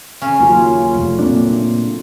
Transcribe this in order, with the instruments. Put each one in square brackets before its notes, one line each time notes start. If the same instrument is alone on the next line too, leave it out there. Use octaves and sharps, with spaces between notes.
[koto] C#3 C#4
[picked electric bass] D#2 [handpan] F#3 F4
[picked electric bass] F1 [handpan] G3 A3
[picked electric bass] A#2 A#3 D4 [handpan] C4